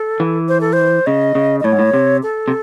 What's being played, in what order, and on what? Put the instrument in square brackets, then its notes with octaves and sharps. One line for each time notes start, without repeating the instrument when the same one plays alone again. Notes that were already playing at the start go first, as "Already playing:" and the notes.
Already playing: [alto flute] A4
[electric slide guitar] E3
[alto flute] C5
A4
C5
[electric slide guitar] C#3 [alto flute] D#5
[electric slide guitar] C#3
[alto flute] D#5
[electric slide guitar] A2 [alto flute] C#5
[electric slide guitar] G#2
A2
C3
[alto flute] A4
[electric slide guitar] C3